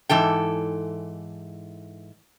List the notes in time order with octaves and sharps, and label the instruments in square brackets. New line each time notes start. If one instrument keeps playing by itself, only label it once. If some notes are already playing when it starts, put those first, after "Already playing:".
[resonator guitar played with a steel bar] G#2 E3 A4 G5